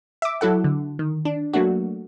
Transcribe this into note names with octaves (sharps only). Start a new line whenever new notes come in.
E5 D6
F#3 E4 A4 F#5
D3
D#3
D4
F#3 A3 A#3 D4 F#4